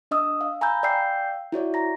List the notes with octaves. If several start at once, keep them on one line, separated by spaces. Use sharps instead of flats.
D4 D#5 D#6 E6
F5
G#5 A#5 B5 E6 G6
D5 F5 G5 E6 G6 C7
E4 F#4 C#5 D5
A#5 A#6